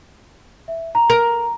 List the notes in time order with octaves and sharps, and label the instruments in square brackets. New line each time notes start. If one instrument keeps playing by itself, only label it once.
[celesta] E5
A#5
[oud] A#4